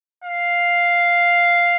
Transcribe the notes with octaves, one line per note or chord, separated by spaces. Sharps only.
F5